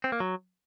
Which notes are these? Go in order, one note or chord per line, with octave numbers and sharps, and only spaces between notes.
C4
A#3
F#3